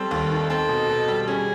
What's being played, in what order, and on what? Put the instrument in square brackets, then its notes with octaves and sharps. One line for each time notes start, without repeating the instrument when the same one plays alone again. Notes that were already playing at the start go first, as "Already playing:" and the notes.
Already playing: [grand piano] G3 C4 [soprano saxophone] A4
[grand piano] D#2
D#3
[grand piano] C4 [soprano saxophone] A4
[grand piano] B2
B2
G3
[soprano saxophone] A4
[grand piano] C#4 [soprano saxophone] G#4